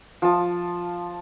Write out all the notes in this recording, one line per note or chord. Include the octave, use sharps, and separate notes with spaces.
F3 A5